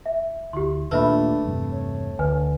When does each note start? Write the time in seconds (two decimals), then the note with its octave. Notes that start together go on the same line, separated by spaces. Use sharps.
0.06 E5
0.53 D2 E4 G4 C6
0.91 D#2 A#2 A3 D4 B4 E5 B5
1.43 E2 G2 C3
1.71 C#5
2.19 D2 B4 G#5